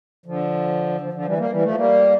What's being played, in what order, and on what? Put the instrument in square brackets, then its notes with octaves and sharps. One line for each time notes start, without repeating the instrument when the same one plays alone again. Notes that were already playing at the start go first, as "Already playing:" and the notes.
[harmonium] D3 F3
D3 F3
D3 F3
E3 G3
G3 A#3
E3 G3
F3 A3
G3 A#3